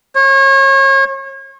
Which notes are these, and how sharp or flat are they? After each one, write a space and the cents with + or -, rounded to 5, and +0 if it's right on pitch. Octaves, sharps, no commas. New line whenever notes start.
C#5 -35